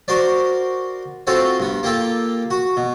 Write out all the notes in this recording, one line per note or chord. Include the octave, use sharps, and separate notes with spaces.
F#4 A#4 C5 D5
C4 F4 F#4 A4 C5
G2 B3
A#3 F4 G4 A4
F#4
B2